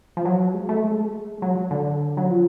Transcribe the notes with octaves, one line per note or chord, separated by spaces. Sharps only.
F3
F#3
G#3
A3
G#3
A3
G#3
F#3
D3
F#3
F3